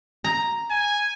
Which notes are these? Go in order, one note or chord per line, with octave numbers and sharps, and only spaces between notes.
A#5
G#5